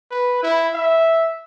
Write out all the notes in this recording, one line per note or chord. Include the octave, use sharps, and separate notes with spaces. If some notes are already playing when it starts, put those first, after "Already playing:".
B4
E4
E5